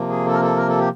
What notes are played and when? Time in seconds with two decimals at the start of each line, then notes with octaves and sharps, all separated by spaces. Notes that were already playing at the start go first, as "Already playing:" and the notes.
Already playing: C3 F3 A#3
0.09 G#4
0.26 A4
0.33 A#4
0.41 A4
0.56 A#4
0.68 A4
0.78 G4